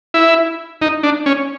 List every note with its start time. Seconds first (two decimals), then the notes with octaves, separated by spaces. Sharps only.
0.14 E4
0.82 D#4
1.03 D4
1.26 C#4